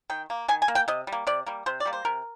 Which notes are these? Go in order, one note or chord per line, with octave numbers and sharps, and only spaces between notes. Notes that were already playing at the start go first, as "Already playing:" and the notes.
D#3 G5
A#3
D#3 G#5
G#5
A#3
G5
C3 D#5
G3
A#3
C3 D5
G3 A#3
C3 C5
D5
G3 A#3
C5
C3 A#4